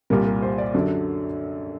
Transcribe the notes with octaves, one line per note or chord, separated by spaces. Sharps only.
C2 A#2 G3 A#4
A#4
C5
D5
F#2 D3 F#3